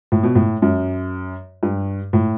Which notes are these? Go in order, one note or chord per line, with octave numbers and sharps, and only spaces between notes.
A2
B2
A2
F#2
G2
A2